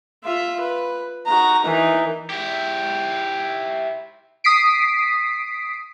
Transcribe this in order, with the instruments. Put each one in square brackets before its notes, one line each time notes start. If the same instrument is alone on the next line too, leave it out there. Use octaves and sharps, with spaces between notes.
[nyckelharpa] F4 E5
B4
[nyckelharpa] D#4 F#4 [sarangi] A#5
[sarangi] E3 [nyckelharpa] D#4 A#4
[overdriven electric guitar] E4 G4
[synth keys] D#6 B6 C7 D7